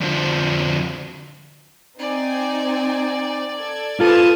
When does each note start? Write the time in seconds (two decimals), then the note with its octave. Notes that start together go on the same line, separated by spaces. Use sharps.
0.01 F2 D3 D4 F4 F#4 C5
1.99 C4 D#4 D5 G#5
3.56 A4 G#6
4.00 F4 A4 B4 C5 A5 D#6 G#6